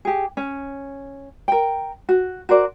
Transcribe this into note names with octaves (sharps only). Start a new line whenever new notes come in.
G4 G#4
C#4
A#4 G5
F#4
F#4 A#4 C5 D5